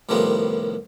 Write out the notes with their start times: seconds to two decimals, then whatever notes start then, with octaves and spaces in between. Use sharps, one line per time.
0.09 C2 A2 D#3 F3 G3 B3